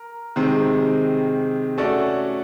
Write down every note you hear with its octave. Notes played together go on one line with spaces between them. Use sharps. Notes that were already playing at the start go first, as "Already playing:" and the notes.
Already playing: A#4
C3 D#3 G#3 C4
A3 C#4 F#4 A4 D5